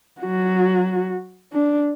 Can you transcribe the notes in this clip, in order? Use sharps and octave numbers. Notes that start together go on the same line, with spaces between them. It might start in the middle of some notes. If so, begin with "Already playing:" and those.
F#3 F#4
D4